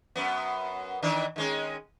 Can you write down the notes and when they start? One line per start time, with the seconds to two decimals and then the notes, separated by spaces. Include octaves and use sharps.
0.16 F#2 B3
1.03 D#3 E3 D4
1.36 D#3 G#3 C#4